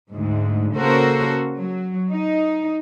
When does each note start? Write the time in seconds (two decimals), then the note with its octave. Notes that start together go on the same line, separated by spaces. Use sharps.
0.10 D2 G#2
0.74 C#3 A#3 F#4 A4 A#4 C5
1.58 F#3
2.10 D#4